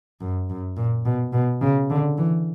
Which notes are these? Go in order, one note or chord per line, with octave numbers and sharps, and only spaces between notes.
F#2
F#2
A#2
B2
B2
C#3
D3
E3